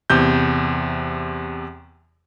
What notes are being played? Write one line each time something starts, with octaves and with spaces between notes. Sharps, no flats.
E2 C3 G6